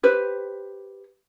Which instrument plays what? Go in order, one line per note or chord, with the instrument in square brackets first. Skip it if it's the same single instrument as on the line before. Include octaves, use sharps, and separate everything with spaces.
[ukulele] G4 B4 C5